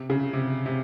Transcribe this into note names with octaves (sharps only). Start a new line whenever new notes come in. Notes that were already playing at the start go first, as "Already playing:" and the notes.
Already playing: C3
C#3
C3
C3